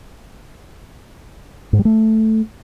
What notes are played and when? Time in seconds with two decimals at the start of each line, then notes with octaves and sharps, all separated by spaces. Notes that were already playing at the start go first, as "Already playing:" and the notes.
1.73 G#2
1.79 G3
1.85 A3